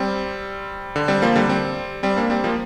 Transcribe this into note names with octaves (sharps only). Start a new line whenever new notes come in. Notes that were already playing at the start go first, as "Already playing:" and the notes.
Already playing: G3 C4
D3
G3 C4
F3 A#3
D3 G3
G3 C4
G3 C4
A#3 D4
G3 C4
F3 A#3